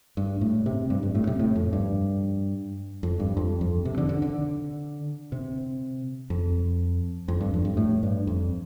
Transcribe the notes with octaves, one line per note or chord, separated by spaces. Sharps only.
G2
A2
C3
G2
G2
A2
C3
A2
F2
G2
F2
G2
F2
F2
C3
D3
D3
D3
C3
F2
F2
G2
F2
G2
A2
G2
F2